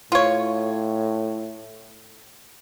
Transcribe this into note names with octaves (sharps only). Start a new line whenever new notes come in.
A2 F4 C#5